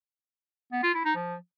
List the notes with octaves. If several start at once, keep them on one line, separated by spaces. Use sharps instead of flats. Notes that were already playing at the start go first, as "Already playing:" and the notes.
B3
F4
E4
D#4
F3